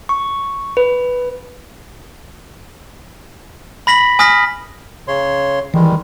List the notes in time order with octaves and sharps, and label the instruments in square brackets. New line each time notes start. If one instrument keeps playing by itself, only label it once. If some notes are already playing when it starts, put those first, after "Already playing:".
[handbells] C#6
B4
[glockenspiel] B5 A#6 B6 F#7
G#5 D#6 F6 A#6 B6
[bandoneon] C#3 C#5 C6
[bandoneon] D#3 G3 G#3 [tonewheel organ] E3